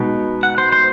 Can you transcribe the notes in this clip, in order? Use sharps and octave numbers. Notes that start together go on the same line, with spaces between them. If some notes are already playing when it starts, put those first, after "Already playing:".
Already playing: B2 G#3 B3 D#4
F#5
C5
C5